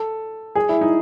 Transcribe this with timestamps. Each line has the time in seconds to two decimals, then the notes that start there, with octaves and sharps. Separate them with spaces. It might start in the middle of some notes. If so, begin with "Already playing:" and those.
Already playing: A4
0.55 G#4
0.69 E4
0.81 D#4